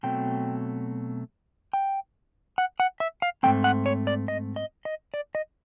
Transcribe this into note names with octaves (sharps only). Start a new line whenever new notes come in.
B2 F#3 A3 C4 G5
G5
F#5
F#5
E5
F5
G#2 F3 A3 C4 G5
F#5
C#5
D5
D#5
D#5
D#5
D5
D#5